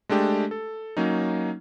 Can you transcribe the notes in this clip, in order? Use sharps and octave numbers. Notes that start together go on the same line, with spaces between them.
G#3 A3 D4 G4
A4
F#3 A#3 C#4 D#4